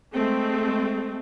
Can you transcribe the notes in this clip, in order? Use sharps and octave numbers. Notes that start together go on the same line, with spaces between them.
G#3 A3 C4